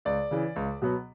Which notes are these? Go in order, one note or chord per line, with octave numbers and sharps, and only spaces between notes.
C#2 D5
C#3 E3
C#2
B2 F#3 B3